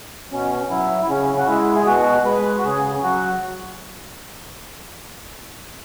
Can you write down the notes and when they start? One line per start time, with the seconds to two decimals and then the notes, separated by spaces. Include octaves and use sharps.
0.31 B2 C#4
0.70 F#3 E4
1.02 E4
1.09 C#3 C#4
1.38 F#4
1.47 G#3 E4
1.75 G#4
1.86 B2 F#4
2.25 G#3 B4
2.58 F#4
2.64 C#3 G#4
3.03 F#3 F#4